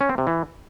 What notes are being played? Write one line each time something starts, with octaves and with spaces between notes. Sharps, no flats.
C#4
C4
C3
E3